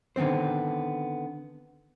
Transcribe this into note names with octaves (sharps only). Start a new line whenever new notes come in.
D3 D#3 B3 C4 C5